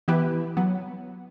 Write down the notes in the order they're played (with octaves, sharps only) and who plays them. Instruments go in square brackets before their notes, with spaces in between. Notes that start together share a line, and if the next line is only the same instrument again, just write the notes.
[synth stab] E3 B3 E4 G4 B4
F#3 B3